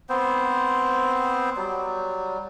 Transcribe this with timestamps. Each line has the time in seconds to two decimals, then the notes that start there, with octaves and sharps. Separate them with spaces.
0.09 B3 C4 C5
1.56 F#3 G3